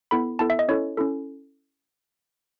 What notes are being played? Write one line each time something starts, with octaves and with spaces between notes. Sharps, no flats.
B3 E4 A4 B5
B3 E4 A4 A5
E5
D#5
C#4 E4 A4 C#5
C#4 E4 A4